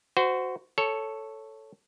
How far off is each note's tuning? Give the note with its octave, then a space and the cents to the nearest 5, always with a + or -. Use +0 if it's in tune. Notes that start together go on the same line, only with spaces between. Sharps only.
F#4 +0 C5 -25
A4 +0 C#5 +0